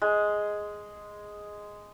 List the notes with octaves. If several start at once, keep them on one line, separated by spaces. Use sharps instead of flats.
G#3